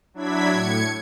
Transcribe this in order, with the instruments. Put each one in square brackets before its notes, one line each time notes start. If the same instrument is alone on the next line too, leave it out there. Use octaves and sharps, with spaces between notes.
[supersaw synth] F#3 D4 E4 G#6 B6
A2 G#6 C#7